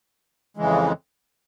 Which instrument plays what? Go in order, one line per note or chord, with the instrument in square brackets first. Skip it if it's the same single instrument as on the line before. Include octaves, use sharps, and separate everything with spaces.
[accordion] F2 C#3 E3 G#3